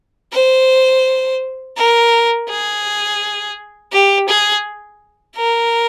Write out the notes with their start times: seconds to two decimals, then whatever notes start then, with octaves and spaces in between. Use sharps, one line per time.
0.33 C5
1.77 A#4
2.49 G#4
3.93 G4
4.29 G#4
5.36 A#4